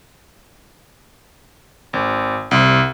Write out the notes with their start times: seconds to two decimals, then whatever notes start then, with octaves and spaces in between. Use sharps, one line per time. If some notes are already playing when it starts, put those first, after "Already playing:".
1.93 G#1
2.51 C2